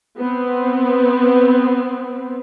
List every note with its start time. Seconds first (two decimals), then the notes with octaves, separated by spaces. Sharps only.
0.18 B3 C4